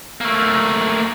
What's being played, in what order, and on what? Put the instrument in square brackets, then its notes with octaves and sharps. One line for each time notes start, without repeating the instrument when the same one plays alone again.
[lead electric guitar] A3 A#3